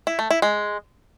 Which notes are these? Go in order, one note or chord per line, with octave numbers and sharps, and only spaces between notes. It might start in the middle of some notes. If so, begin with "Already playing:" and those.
E4
A3
E4
G#3